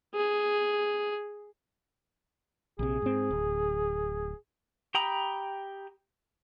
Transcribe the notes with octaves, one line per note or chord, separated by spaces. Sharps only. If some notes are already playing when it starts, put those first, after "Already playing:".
G#4
A#1 C3 G#4
G#2 C4
D1
G4 G5 A#5 B5 D#6